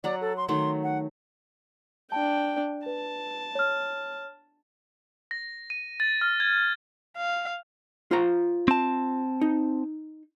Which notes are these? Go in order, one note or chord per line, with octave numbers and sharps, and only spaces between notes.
F#3 D5 F#5 A#5
A4
C6
D#3 F#3 A3 C6
F#5
D4 G5 A5
B4 A5
C#5 F6
A#6
D#7
A6
F6
G#6
F5
F4 C5 A#5
C4 A5
D#4